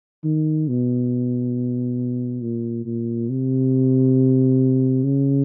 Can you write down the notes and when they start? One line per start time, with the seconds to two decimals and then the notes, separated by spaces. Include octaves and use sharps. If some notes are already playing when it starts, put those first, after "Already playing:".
0.24 D#3
0.68 B2
2.42 A#2
2.86 A#2
3.29 C3
5.04 C#3